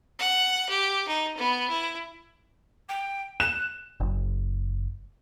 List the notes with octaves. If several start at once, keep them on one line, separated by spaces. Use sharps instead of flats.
F#5
G4
D#4
B3
E4
G5
F#6 E7
F#1